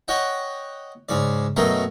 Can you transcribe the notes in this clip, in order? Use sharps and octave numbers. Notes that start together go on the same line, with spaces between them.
C#5 D#5 F#5 G5
G#2 C#3 D5
F#2 B2 A3 A#4 D#5 G5